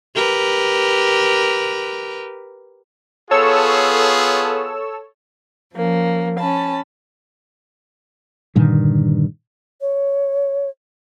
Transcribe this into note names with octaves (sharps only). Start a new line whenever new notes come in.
G4 A#4 B4
B3 F4 G#4 A4 C#5 E6
F3 A#3 C#4
C#4 A5 B5
G2 A#2 D3 D#3
C#5